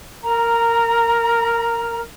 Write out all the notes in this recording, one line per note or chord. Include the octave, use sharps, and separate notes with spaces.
A#4 A#5